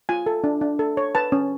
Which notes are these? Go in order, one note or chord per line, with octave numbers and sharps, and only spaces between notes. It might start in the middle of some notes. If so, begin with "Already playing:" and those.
F4 G#5
A4
D4
D4
A4
C#5
B4 A5
C#4